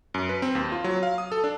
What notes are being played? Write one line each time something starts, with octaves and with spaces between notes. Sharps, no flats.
F#2
B4
C4
D#2
F4
F#3
F5
D#6
A4
D4